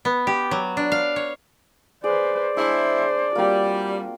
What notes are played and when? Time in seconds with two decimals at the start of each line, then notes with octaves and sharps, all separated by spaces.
0.05 B3
0.27 G4
0.51 F#3
0.77 D4
0.92 F5
1.16 C#5
2.04 G#4 B4 C5 D5
2.57 G#3 D4 E4 C5 E6
3.35 G3 A#3 C4 F4 F#4